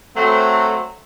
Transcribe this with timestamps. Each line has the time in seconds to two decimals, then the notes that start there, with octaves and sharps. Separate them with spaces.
0.16 F#3 A3 C4